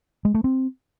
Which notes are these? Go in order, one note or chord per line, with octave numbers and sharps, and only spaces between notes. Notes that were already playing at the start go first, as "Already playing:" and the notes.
G#3
A3
C4